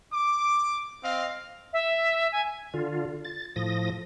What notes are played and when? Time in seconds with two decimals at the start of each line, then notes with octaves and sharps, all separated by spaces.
0.12 D6
1.03 C4 D#5 F5
1.73 E5
2.32 G#5
2.74 D3 F4
3.25 A6
3.56 A2 F3 D#6 A#6